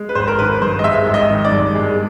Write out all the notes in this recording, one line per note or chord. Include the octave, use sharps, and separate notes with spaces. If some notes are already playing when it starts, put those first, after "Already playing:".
Already playing: G#3
B4
G#1 C5
A#4
D#3 B4
G2 C5
D#5
G#3 E5
G#1
D#5
D#3
D5
G2
G#3